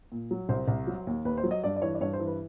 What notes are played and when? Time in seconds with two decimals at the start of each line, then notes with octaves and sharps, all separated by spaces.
0.12 A#2
0.31 F#3
0.49 C2 C5
0.68 C2
0.87 F#3
1.07 D#2
1.25 D#2 B4
1.37 C5
1.44 F#3
1.51 D#5
1.63 G2 D5
1.76 D5
1.82 E3 C#5
1.94 D5
2.01 G2 C#5
2.13 C5
2.20 E3
2.27 B4